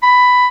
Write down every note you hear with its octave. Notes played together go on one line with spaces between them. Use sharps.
B5